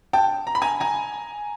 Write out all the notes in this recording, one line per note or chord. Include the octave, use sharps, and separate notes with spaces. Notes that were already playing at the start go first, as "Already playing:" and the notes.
G5 A5
A#5
B5
G#5 A#5
G#5 A#5